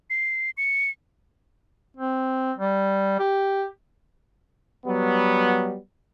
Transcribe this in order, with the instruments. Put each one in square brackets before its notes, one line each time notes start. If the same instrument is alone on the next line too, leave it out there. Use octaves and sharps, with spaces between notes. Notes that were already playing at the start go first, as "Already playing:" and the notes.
[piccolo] C7
C#7
[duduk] C4
G3
G4
[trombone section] F#3 G3 B3